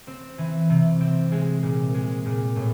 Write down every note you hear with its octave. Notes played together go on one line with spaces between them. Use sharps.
C4
E3
C3
C4
G#3
A#2
G#3
A#2
A2